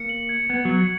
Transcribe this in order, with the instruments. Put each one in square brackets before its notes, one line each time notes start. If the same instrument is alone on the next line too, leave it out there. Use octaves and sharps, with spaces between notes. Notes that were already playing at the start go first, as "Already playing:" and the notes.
Already playing: [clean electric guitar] A#3 [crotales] C#7
[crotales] F#7
G#6
[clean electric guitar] B3 [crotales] G#6
[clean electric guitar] F#3 [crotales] G#6